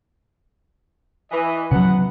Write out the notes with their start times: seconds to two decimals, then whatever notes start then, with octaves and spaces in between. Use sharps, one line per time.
1.32 E3 D#5
1.72 C#3 F#3 B3 F#5